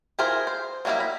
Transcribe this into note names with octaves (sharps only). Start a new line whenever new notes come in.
E4 F4 G#4 A#4 C5
C5
F#3 G3 A#3 D#4 E4
B5